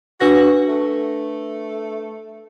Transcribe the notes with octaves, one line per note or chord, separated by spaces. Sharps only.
D4 F#4 B4 A#6
A3